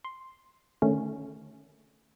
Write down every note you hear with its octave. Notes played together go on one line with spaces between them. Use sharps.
C6
D3 D#3 A3 C#4